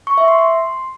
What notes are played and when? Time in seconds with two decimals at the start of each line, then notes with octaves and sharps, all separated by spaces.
0.07 C#6
0.18 E5
0.28 C6
0.39 C6